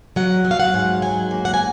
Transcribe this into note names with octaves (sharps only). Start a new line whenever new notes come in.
F#3 F#5
F#3
F5
F#5
G#2
F#3 G#5
A#3
F#5
G#5